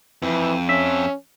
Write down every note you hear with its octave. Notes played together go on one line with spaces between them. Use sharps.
F2 E3
C#4 E5